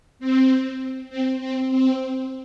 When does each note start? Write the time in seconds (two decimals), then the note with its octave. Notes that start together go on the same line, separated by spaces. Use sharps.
0.19 C4
1.10 C4
1.40 C4
1.71 C4